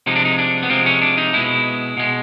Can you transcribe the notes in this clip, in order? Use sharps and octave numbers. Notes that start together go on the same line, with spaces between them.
C3 F3 G#3 D#4
D4
D#4
D4
B3
C3 F3 G#3 C4
C#4
D4
D#4
B2 G#3 E4
B2 G#3